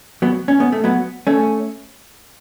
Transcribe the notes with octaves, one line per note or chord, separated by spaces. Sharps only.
F#3 B3
C#4
B3
A3
F#3 B3
A3 C#4